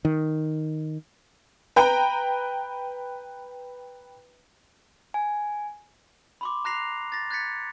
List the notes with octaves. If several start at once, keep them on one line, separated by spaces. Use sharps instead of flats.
D#3
B4 G5 A#5
G#5
B5 C6 D6
A#5 F#6 A#6 C7 F7
A6 A#6
F#6 G#6 A6 B6 C#7